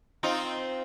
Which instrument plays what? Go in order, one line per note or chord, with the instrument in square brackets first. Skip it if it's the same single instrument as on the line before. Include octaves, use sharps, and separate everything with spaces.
[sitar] C4 D#4 F4